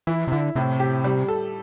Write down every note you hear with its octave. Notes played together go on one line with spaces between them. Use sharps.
E3 E4
C3
D3 E4
A2 C3
G4
G3
A4